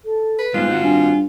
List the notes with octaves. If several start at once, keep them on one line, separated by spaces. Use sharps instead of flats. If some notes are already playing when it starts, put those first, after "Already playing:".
A4
B4
G#2 G3 G#3 B3 F4 F#6
C4 F#4
G2 D#4 G#5